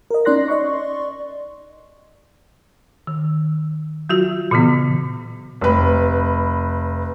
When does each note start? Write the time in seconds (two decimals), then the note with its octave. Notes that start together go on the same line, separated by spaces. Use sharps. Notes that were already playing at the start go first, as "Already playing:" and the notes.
0.11 A#4 D#5
0.25 C#4 D#4 D5 C6 F#6 A#6
0.48 D5 D#5 C6 C#6
3.07 D#3
4.09 F#3 F4 F#4
4.51 A#2 C#3 E3 B3
5.61 F1 B4